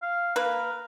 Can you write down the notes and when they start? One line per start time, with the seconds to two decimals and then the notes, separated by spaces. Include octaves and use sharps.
0.03 F5
0.36 A#3 A#4 B4